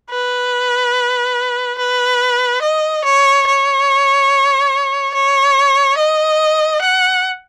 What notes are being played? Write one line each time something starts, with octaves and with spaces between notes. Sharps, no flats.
B4
B4
D#5
C#5
C#5
C#5
D#5
F#5